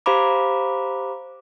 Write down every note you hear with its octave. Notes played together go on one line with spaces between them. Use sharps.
G4 C5 F5 A#5 B5 D6